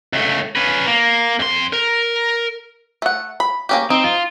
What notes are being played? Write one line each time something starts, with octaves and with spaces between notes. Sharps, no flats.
C#2 A3
C#4 B4
A#3
F2 C6
A#4
A3 F#5
B5
A#3 C#4 G4
C4 D#4
F4